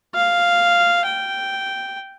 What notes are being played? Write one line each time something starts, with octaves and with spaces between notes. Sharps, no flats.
F5
G5